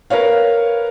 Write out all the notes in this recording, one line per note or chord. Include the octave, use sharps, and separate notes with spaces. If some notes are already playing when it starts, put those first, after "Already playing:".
A#4 B4 C#5 F5